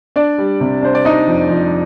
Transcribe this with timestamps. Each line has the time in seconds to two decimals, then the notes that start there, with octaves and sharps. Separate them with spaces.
0.16 D4 D5
0.38 G3
0.60 C3
0.82 D4 C5
0.95 D5
1.05 D4 D#4 D#5
1.27 F2
1.50 F2